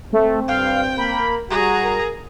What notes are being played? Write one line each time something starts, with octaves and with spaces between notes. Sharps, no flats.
A3 C4
G2 F5 G5
A#3 A#4 B5
G3 F#4 G#4 A#5
A#4